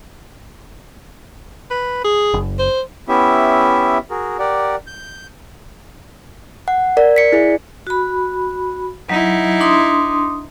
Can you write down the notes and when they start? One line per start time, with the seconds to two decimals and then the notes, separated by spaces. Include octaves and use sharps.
1.70 B4
2.04 G#4
2.34 F#1
2.59 C5
3.09 B3 C#4 E4 G4 E5
4.10 F#4 G#4 A#4
4.39 G4 A#4 D5 F#5
4.87 G6
6.68 F#5
6.97 A#4 D5
7.16 B6 C#7
7.32 E4 G#4 D5
7.87 F#4 B5
9.10 F#3 D#4 E4
9.61 D4 C6 D#6